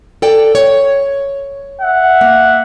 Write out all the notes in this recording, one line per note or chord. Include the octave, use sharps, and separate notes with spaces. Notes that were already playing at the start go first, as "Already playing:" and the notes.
A4 D5 G5
C#5
E5 F#5
A#3